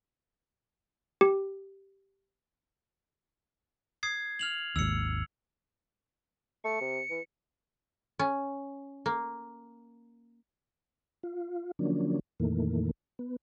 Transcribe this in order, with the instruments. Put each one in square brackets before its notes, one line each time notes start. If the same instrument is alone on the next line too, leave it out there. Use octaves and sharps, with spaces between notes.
[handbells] G4
[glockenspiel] D#6 G#6 C7
F6 F7 F#7
[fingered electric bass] G#1 D#2 [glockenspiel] E6 C#7
[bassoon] A3 [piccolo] C#7
[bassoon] C3
E3
[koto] C#4
A#3
[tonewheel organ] F4
D3 F3 F#3 A#3 C#4 D4
F2 A#2 D#3 E3 A3 A#3
B3